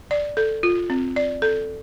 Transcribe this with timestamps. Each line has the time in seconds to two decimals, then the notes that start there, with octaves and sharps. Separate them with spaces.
0.11 D5
0.37 A4
0.63 F4
0.90 C4
1.16 D5
1.42 A4